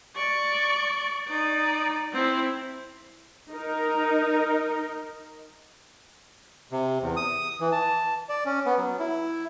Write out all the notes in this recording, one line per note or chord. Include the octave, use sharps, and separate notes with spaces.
D5 C#6
D#4 D5
C4 E4
D#4 A#4
C3
E2
D#6
E3
A5
D5
C#4
B3
F#3
E4